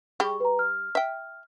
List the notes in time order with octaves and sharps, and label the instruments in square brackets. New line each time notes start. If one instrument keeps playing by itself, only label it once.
[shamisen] G3 G4 [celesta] G#4 C#6
[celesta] B4 A#5
F6
[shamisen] E5 G5